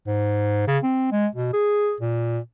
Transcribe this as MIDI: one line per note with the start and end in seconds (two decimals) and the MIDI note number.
0.07 0.65 44
0.67 0.78 49
0.83 1.07 60
1.12 1.27 56
1.35 1.53 47
1.53 1.95 68
2.00 2.39 46